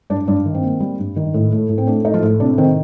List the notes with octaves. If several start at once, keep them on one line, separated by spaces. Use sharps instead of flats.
G2 D4
G2 D4
D#3
C4
A#3
G3
G2
D#3
A2
A3
A2
C4
A3 D4
A3 D#4
F3 F4
A2
C3 D4
D#3 C4